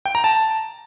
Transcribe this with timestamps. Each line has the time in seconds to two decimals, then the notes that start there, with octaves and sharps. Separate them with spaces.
0.05 G5
0.15 A#5
0.24 A5